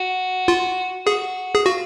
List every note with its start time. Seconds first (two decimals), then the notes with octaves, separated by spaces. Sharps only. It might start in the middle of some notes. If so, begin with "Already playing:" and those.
Already playing: F#4
0.48 F4
1.06 F#4 G#4
1.55 G#4
1.65 F4 F#4